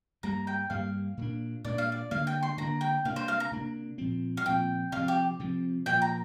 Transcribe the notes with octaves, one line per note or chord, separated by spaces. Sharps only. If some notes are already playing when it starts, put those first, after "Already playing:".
G2 G3 A#3 A#5
G5
G2 G3 A#3 F5
A#2 A#3 D4
A#2 A#3 D4 D5
F5
D5
D3 A#3 D4 F5
G5
C6
D3 A#3 D4 A#5
G5
C3 A#3 D4 F5
C5
F5
A#5
C3 A#3 D4
A#2 F3 C4
F5
A#2 F3 C4 G5
C3 F3 C4 F5
G4
C3 F3 C4
A#2 F3 A#3 G5
A#5